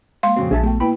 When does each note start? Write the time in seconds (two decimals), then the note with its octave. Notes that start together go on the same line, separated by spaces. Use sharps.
0.23 G#3 A#3 F5 C6
0.36 F2 A#2 C#3 C4 F#4
0.51 A#1 G#4 E5 A5
0.63 A3 B3 G5
0.80 A#3 E4 B4 G5 B5